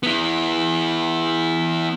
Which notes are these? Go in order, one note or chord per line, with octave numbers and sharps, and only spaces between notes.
B3 E4